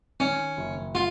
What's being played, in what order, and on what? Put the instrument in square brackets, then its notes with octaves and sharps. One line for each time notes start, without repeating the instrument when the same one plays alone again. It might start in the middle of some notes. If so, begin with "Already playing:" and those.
[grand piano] D#3 [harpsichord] C#4
[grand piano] F#1
[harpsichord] F4